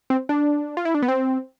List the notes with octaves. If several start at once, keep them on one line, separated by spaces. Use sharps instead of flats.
C4
D4
F4
E4
D4
B3
C4